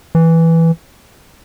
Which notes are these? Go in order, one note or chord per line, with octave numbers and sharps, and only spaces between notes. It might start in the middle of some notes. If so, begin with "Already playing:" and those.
E3